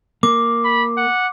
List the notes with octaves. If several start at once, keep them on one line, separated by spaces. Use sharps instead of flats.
A#3 D6
B5
F#5